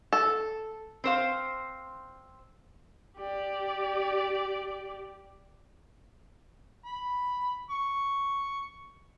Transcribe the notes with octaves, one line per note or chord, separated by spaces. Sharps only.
A4
C4 C5 F5
G4 D5
B5
C#6